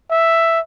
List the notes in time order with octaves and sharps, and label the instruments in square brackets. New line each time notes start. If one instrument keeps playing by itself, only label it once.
[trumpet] E5